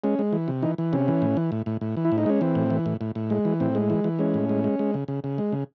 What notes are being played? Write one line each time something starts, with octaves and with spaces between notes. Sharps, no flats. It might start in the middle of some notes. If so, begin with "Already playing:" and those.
G#3 C#4
G#3
E3
C3
E3 D#4
E3
C3 C#4
E3
A2
E3
A2
A2
A2
E3
E4
A2
D#4
G#3 C#4
E3 C4
A2
E3
A2
A2
A2
G#3
E3
A2 C4
G#3
E3
E3
G#3 C#4
A2
G#3
G#3
G#3
C#3
C#3
C#3
G#3
C#3